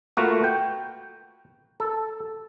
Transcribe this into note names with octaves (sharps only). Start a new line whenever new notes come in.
A3 A#3 F4 F#4 B4
G5
A4